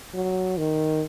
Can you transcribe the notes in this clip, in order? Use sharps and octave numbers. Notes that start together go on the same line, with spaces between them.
F#3
D#3